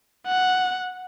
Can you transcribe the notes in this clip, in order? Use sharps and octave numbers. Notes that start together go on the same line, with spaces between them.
F#5